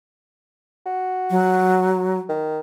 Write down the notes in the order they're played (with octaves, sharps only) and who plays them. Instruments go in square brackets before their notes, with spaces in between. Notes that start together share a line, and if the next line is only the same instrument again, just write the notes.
[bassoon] F#4
[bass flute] F#3
[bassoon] D#3